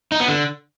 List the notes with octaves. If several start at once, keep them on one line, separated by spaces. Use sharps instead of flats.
D#4
B3
D3